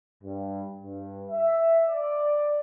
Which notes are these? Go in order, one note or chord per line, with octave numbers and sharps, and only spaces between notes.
G2
G2
E5
D5